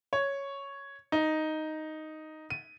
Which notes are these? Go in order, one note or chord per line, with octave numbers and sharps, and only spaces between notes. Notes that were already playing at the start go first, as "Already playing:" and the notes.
C#5
D#4
D#7